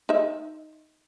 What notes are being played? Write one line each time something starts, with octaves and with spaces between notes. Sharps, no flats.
D#4 E5